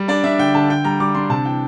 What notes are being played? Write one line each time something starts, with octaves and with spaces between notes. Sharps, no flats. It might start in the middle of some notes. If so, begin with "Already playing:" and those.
Already playing: G3
D4 D5
D4 E5
D3 G5
D3 A5
D3 G5
G3 A#5
G3 D6
D4 C6
C3 A5
E3 G5